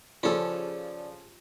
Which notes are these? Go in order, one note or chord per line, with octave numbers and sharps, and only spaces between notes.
C#3 F3 C#4 F4 G4 A4 D5